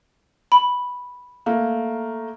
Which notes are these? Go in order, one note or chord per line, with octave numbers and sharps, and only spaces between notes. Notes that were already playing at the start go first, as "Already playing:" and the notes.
B5
A3 A#3